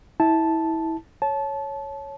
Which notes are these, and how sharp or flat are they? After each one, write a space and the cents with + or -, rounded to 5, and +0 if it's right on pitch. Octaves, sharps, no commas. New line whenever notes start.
E4 -25 A5 -5
C#5 +0 A5 -20